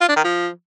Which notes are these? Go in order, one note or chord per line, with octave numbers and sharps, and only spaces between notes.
F4
D4
D#3
F3